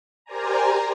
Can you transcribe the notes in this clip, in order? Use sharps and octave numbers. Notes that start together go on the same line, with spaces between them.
G4 A#4 C5 D5 G#5 A#5